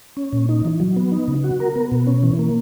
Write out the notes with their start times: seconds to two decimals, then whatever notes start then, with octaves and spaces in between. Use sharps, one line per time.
0.17 C#4
0.33 A#2
0.49 D#4
0.65 E3
0.80 F#3
0.96 B3
1.12 D#4
1.28 C#3
1.44 F#4
1.60 A#4
1.75 B3
1.92 B2
2.07 C#4
2.23 E3
2.39 A#3